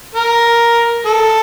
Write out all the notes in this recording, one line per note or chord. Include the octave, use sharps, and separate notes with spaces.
A#4
A4